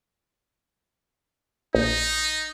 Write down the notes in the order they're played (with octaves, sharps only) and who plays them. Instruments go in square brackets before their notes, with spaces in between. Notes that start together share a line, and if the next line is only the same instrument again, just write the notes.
[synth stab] A#1 [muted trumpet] D#4